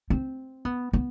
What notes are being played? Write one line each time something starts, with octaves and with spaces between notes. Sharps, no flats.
C4
B3
B3